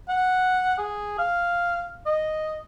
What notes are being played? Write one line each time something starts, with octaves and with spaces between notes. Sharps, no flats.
F#5
G#4
F5
D#5